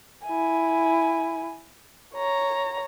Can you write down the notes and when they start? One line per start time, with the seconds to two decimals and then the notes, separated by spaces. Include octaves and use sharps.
0.25 E4 G#5
2.14 C#5 A#5